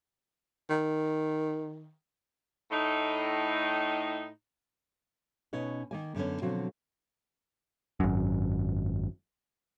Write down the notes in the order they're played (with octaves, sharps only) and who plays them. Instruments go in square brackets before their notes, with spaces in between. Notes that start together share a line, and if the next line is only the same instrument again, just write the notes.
[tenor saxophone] D#3
[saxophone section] A2 D#4
[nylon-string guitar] B2 C#4 D#4 B4
D#3 A#3 G#5
F#2 D3 B3 C#4
B2 D3 F3 F#3 C4 F#4
[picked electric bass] G#1 F#2